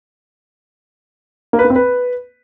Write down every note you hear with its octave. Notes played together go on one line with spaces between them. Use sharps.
A#3
B4
A#3
C4
B4